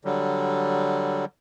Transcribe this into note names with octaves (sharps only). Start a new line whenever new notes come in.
D3 F#3 G3